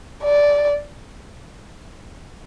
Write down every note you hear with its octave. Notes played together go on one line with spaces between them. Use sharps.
D5